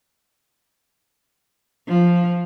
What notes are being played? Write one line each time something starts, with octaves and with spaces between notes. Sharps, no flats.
F3